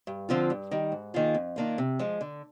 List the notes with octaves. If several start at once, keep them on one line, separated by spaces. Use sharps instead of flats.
G2
D3 F3 C4 F4
G2
D#3 G3
G#2
D#3 A#3 F4 G#4
F2
D#3 A#3 D4 F4
C3
F3 G#3
D3